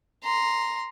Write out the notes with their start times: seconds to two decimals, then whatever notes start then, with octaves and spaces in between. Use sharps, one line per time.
0.23 A#5 C6